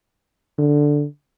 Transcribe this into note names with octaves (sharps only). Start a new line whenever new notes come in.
D3